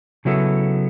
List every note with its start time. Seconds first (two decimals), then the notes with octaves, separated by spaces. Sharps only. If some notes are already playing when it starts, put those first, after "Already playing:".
0.25 C#3 F#3 B3 E4 A4